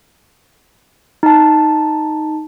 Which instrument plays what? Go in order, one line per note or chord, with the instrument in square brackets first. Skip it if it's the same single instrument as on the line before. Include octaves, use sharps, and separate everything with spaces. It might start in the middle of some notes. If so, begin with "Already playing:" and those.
[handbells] D#4 A5